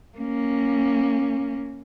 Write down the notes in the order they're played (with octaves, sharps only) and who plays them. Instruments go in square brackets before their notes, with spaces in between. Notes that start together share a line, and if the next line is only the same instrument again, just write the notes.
[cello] A#3 C#4